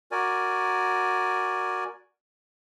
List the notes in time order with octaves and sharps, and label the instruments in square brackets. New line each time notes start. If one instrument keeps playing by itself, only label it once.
[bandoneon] F#4 A#4 D5 G#5